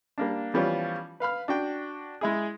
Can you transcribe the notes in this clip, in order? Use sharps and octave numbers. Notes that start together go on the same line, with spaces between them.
G3 A#3 D4
E3 F3 G3 B3 C#4 F4
B4 F5 B5 F6
D4 F#4 G5
G#3 E4 G#4